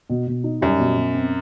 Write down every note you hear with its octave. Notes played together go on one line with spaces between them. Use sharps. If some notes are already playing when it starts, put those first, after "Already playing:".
B2
B2
D#4
F#2 G3
B2
B2
C4